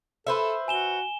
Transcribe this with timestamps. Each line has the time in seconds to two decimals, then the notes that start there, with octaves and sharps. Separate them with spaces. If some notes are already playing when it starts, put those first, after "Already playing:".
0.27 A4 B4 C5 E5
0.68 F#4 G#5 E7 G7